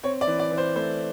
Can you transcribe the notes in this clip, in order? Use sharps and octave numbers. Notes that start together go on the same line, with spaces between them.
C4 C#5
D5
E3
D5
E3
C5
A3 C5